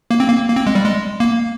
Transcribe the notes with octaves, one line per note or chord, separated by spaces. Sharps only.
A#3
C4
A#3
A#3
C4
G#3
G3
G#3
A#3